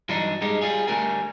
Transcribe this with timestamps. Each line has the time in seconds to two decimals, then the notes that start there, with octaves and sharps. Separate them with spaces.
0.09 G2 E3 F#3 D4 D#4
0.41 G2 G#3 D#4 G4
0.61 G3 F4 G#4
0.88 D3 G3 A3 D#4 A#4 G#5